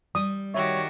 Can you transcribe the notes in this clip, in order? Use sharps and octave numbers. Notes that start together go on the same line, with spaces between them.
G3 D#6
D#3 F#4 G4 C#5 E5